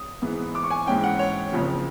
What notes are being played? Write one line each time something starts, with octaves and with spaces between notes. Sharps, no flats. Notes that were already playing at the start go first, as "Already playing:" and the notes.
Already playing: D#6
G#2 E3 G#3 B3
D6
C#6
G#5
G#2 E3 G#3 C#4 G5
F#5
C#5
F#1 F2 C#3 F3